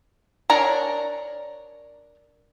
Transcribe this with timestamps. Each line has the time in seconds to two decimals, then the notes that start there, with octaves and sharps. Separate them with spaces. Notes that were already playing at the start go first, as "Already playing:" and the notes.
0.50 D4 A#4 C#5 G#5 A#5